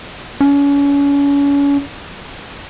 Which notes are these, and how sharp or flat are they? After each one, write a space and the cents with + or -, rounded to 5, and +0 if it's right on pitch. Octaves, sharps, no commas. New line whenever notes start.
C#4 +35